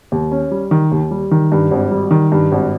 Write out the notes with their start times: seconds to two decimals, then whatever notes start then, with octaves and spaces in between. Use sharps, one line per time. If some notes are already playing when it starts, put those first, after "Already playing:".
0.12 D#2
0.32 C#4
0.51 G3
0.71 D#3
0.92 D#2
1.11 G3
1.31 D#3
1.52 G2
1.71 G#1
1.91 G3
2.11 D#3
2.32 G2
2.52 G#1